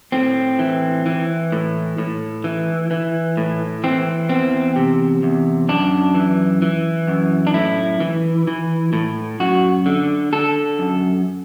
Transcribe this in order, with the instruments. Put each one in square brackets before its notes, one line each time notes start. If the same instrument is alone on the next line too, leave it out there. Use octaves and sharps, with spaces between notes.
[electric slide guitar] A2 C4
E3
E3
A2
A2
E3
E3
A2
E3 C4
E2 C4
C3
E2
F#2 D4
E3
E3
F#2
D4
A2 E4
E3
E3
A2
F#2 F#4
D3
D3 A4
F#2